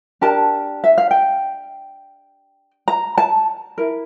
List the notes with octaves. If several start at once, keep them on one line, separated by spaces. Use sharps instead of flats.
D4 G4 A#4 A5
E5
F5
G5
A#5
A5
E4 A#4